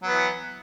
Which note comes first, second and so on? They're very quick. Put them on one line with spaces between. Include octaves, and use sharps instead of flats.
F#3 B3 E3